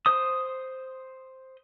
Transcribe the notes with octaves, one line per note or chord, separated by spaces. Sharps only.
C5 D#6